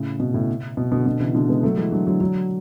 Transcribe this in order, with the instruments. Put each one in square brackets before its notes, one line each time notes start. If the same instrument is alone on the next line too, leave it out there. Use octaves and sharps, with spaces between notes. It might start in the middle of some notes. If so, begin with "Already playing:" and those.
Already playing: [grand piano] A2 C#3
B2
A2 C#3
B2
B2 D3
B2 D3
C#3 E3
B2 D3
G#3 B3
F#3 A3
E3 G#3
D3 F#3
D3 F#3
D3 F#3